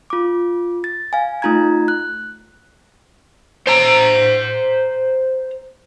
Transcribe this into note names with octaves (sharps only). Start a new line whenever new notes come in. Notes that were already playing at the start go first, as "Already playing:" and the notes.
F4 D6
A6
F5 G#5
A3 D#4 F4 A#5 G#6
F#6
C5 A#5